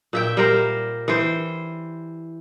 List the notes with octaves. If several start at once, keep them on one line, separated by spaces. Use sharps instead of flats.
A#2 E5 G5
G3 A#4 C5
E3 C5